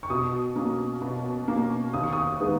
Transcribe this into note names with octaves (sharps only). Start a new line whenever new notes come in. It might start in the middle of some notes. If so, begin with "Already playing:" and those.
C#6
B2 D#6
A#3 C#4
B2
A#3 C#4
D#2 D#6
C#6
D#6
D#3 G#3 B3